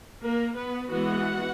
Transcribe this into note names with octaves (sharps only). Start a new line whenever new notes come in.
A#3 A#4
B3 B4
E3 G#3 B3 F#4 F#5